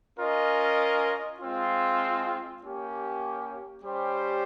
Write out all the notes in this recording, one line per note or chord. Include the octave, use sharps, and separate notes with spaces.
C#4 F4 A#4 D#5
G#3 C4 F4
A#3 C#4 G4
G3 C#4 G4 C5